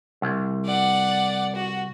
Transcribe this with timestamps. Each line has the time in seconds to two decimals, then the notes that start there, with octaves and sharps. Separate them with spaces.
0.22 C2
0.66 D5 F#5
1.55 F#4